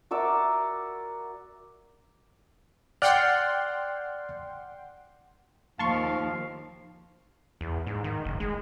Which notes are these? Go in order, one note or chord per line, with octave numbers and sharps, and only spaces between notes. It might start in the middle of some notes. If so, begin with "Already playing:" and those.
F#4 A#4 D5 E5
D5 F#5 G5 C6 F6 F#6
D#2 F3 F5 A5 C6 C#6
E2
G#2
D#3
F#1
G#3